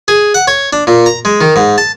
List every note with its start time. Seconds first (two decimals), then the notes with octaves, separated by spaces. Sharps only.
0.08 G#4
0.34 F#5
0.48 C#5
0.73 D4
0.87 A#2
1.06 A#5
1.25 G#3
1.41 D#3
1.56 G#2
1.78 A5